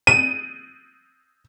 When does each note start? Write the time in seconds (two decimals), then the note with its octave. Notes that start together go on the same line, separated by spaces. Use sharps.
0.07 D#7